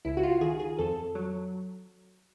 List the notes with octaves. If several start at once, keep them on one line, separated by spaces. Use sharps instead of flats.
C#2 E4
F#4
F4
D#3 G#4
G#4
F2 A4
F#3